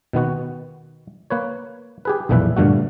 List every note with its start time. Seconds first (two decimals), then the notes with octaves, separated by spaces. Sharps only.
0.13 B2 D#3 B3 F#4
1.30 A#3 B4 C#5
2.05 G4 G#4 B4
2.29 B1 F2 A#2 E3 B4 E5
2.56 G2 A#2 D3 A3 F#4